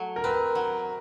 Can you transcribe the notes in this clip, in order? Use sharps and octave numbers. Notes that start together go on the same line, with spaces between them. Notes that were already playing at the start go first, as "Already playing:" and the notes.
Already playing: F#3 A3
A#4
C4 B4
F#3